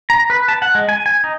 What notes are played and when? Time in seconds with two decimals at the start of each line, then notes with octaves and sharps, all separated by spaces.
0.10 A#5
0.30 B4
0.48 A5
0.62 F#5
0.75 G#3
0.89 G#5
1.06 G#5
1.24 D#4